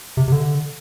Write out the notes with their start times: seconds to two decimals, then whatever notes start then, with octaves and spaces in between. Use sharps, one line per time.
0.17 C3
0.28 C3
0.32 D3